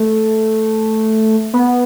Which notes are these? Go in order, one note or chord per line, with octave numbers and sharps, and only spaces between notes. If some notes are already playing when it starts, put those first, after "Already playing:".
Already playing: A3
B3